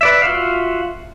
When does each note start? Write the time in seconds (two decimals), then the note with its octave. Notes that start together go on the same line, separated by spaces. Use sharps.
0.01 B4 D5 E5
0.22 F4 F#4 E5 F5